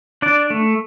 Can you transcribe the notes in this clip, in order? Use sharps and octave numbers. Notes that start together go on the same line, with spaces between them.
D4 D5
A3